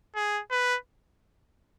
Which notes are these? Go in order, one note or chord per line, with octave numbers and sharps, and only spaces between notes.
G#4
B4